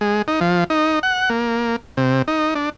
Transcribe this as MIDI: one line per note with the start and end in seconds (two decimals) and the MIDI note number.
0.01 0.22 56
0.28 0.40 63
0.41 0.64 53
0.70 0.99 63
1.03 1.29 78
1.30 1.76 58
1.97 2.22 48
2.28 2.54 63
2.55 2.70 62